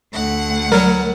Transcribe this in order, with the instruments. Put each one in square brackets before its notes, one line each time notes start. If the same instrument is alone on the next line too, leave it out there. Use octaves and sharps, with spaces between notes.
[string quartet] D2 F#5
[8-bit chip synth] F#3 G3 [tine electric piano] A#4